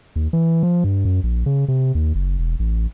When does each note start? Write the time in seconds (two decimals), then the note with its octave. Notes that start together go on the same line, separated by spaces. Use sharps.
0.16 D#2
0.33 E3
0.63 F3
0.84 G2
1.05 F#2
1.23 A#1
1.46 C#3
1.68 C3
1.95 D#2
2.15 F#1
2.39 E1
2.59 A1